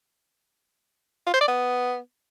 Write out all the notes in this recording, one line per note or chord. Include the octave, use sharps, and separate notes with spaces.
F4
C5
D5
B3